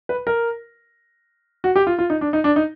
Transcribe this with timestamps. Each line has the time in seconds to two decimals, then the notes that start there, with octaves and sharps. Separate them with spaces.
0.09 B4
0.27 A#4
1.64 F#4
1.76 G4
1.87 F4
1.99 F4
2.10 D#4
2.21 D4
2.33 D#4
2.44 D4
2.56 D#4